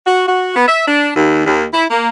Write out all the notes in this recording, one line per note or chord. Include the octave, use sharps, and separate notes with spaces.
F#4
F#4
B3
E5
D4
D#2
D#2
E4
A#3